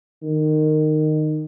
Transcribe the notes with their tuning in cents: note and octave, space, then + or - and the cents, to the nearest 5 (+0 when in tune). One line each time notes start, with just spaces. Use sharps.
D#3 -15